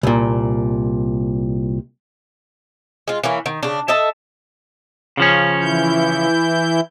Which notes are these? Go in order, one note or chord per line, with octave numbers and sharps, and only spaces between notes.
C2 A#2
G#3 F4
E3 A#3 C#4
D#3
C#3 D4
A4 D#5 E5 A5
C#3 F3 C#4
E3 E4 G6